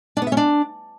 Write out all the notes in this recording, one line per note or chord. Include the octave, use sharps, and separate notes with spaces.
D4
B3
E5
C#4
D4